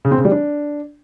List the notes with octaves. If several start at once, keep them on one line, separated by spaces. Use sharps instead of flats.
C#3
C4
C#3
G3
D4